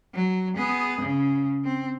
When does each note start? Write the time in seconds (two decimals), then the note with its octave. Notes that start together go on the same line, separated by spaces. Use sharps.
0.14 F#3
0.56 B3 G#4
1.02 C#3
1.64 C4